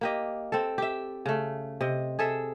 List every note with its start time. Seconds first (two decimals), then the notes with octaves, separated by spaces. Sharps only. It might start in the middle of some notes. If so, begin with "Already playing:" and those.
0.01 A#3 G4 D#5
0.52 C4 A4
0.78 G4 E5
1.26 C#3 A3
1.81 C3 D#5
2.19 G#4 A4 E5